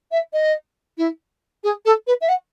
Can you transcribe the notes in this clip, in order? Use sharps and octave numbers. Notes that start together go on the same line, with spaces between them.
E5
D#5
E4
G#4
A4
B4
E5
F#5